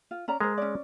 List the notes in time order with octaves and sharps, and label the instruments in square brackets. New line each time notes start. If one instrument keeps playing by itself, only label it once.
[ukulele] F4
C#4 D5 A#5
[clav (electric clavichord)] G#3 [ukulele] A#4 C5
[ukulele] C#4 D5